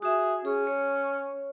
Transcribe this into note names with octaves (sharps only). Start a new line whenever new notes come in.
F#4 G#4 E5
C#4 G#4
C#5